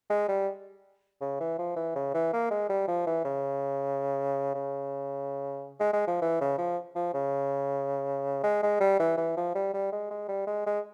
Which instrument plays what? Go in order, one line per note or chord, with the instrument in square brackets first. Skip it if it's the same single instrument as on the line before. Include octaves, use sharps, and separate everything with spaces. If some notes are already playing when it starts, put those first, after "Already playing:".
[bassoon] G#3
G3
C#3
E3
F3
E3
C#3
E3
A#3
G#3
G3
F3
E3
C#3
C#3
G#3
G#3
F3
E3
C#3
F3
F3
C#3
G#3
G#3
G3
E3
E3
F3
G3
G3
G#3
G#3
G3
G#3
G#3